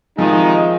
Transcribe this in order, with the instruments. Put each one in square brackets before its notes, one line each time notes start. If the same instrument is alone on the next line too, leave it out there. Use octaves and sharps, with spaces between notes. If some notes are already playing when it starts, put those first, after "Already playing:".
[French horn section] C3 D#3 G#3 D#4 [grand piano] F3